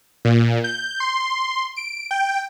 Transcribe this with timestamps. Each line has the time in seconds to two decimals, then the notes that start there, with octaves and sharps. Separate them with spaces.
0.25 A#2
0.64 G6
1.00 C6
1.76 D7
2.11 G5